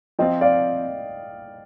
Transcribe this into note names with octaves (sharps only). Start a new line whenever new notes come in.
F3 C4 F4 D#5 G5
D5 F5